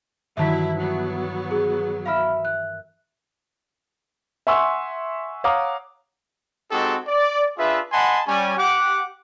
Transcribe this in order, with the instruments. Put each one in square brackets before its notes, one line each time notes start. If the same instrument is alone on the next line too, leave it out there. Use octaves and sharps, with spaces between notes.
[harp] G2 D#3 E3 [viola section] F#3 E4 [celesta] E5 A5 B6
[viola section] F#3 B3
[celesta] G#4
[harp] A#4 E5 [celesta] F5 B5 F6
[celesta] F#6
[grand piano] E5 F#5 G#5 C6 C#6 E6
C#5 F5 F#5 A#5 D6 D#6
[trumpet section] G#3 C4 D#4 F#4 G4 A4
D5
D4 F4 G#4 B4 E5
D#5 F#5 G#5 A5 B5 C6
G3 C#4 G#5
G4 F#5 D6